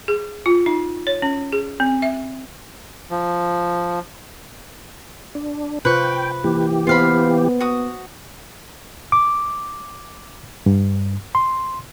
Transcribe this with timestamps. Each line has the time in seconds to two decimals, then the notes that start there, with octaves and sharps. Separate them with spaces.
0.08 G#4
0.46 F4
0.66 D#4
1.07 C#5
1.22 C#4
1.52 G#4
1.80 C4
2.02 E5
3.10 F3
5.35 D4
5.85 C3 F4 B4 C5 G5 C#6
6.44 E3 A#3 G4
6.87 B3 F4 B4 C5 F5 B5
7.60 F#4 D#6
9.12 D6
10.66 G2
11.35 C6